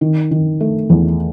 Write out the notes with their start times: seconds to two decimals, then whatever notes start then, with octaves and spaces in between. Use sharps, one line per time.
0.01 D#3
0.31 D#3
0.60 A3
0.90 E2